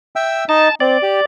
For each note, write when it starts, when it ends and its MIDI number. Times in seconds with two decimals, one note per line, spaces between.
0.16 0.44 76
0.16 0.44 79
0.16 0.44 88
0.49 0.68 63
0.49 0.68 75
0.49 0.75 81
0.80 0.97 60
0.80 1.25 74
1.02 1.20 67